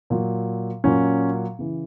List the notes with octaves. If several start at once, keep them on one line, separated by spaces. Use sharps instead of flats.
A#2 F#3
A#2 F#3 C#4
C#3 E3